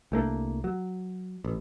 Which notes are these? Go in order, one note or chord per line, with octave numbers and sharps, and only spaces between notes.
C2 A3 A#3 D4
F#3
A1